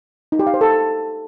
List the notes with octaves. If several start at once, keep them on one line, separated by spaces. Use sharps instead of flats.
D#4
G4
F5
C5
A4